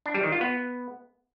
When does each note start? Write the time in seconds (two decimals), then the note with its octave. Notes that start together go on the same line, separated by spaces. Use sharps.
0.06 D4
0.14 G3
0.23 D#3
0.32 F4
0.41 B3